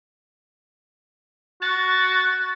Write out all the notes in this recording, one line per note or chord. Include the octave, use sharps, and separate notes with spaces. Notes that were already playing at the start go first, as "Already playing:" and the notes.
F#4 A6